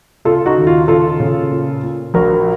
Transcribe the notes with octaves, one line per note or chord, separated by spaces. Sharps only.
C#3 F4 A4
D#4 F#4
D#2
F4
C#3 F4 A4
C#3
A#2
A#2
A#1 F#4 A#4